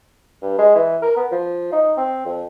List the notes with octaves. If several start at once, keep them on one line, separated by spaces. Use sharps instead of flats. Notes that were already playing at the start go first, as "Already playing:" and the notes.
G2
G#3
E3
A#4
B3
F3
D#4
C4
F2